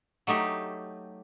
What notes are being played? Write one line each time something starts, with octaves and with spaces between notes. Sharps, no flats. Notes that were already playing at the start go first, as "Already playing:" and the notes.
F#3 A3 D#4 G4